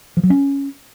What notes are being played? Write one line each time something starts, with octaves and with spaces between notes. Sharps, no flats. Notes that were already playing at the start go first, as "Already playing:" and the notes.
F3
F#3
C#4